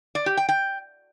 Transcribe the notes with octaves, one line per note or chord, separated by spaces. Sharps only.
D5
G4
G5
G5